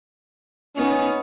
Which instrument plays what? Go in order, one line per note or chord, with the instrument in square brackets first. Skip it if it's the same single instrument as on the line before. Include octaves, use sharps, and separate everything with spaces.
[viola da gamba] B3 D#4 [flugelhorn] C#4